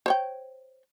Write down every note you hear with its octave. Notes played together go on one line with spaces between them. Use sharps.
C5 C#5 G5